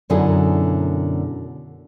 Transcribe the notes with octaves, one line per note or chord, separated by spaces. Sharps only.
F#2 B2 D3 D#4 E4 G#4